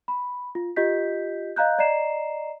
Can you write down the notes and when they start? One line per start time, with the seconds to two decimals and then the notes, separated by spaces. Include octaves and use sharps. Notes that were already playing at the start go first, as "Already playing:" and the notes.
0.08 B5
0.55 F4
0.76 F4 G4 D#5 G6 B6
1.56 D#5 F5 A#5 F#6 G6
1.78 D5 D#5 A#5 C7 E7